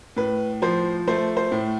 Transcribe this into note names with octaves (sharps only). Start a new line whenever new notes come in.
A2 B4
F3 C5
A3 C5
C5
A2